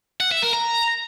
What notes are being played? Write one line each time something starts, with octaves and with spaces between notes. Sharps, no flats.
F#5
E5
A#4
A#5